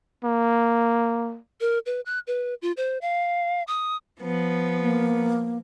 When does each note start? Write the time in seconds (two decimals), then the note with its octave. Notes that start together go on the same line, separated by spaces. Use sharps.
0.24 A#3
1.61 A#4
1.86 B4
2.06 F#6
2.27 B4
2.62 F4
2.77 C5
3.01 F5
3.67 D#6
4.19 F3 B3
4.80 A#3